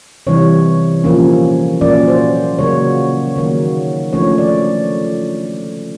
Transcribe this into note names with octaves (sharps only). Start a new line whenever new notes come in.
C3 E3 G3 C#5
A#2 F3 A#3 C#4
A#2 F#3 A#3 C#4 D5
C5
C#3 F#3 A#3 C#5
D#3 F#3 A#3
D3 F3 A3 C#4 C#5
D5